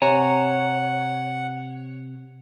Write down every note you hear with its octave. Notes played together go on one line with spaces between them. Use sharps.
C3 C#5 F#5 G#5 A#5